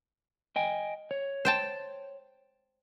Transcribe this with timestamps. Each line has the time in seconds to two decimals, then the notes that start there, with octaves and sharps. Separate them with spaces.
0.56 D#5 G5 G#5
1.11 C#5
1.45 C5 G5 A5